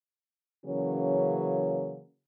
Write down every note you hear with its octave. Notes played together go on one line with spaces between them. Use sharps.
C#3 E3 F#3 A#3 C#4